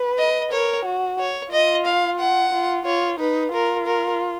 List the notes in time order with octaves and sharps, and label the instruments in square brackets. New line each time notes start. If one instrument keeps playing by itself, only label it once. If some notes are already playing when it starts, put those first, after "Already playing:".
Already playing: [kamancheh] B4
[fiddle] D#5
[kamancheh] A#4 [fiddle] C#5
[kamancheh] F#4
[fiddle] C#5
[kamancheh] F4 [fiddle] D#5
[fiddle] F5
F#5
[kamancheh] F4
[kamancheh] F4 [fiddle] C#5
[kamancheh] D#4 [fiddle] B4
[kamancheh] F4 [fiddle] A#4
[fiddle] A#4